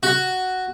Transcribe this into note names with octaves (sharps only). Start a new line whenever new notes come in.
F#4